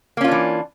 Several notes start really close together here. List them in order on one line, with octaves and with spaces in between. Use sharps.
A#3 C#4 F4 D4 E3